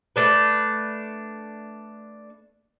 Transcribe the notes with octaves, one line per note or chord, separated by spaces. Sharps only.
A3 D4 B4